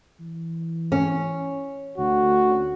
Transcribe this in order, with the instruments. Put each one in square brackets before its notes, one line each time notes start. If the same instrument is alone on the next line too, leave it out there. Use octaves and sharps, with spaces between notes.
[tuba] E3
[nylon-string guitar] C#4
[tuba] D2 [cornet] F#4